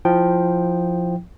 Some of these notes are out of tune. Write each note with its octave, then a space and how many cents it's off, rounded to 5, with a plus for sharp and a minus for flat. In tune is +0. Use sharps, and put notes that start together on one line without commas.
F3 +5 E4 +0 G5 +0